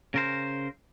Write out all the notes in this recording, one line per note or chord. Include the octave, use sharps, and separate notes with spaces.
C#3 A#4 C5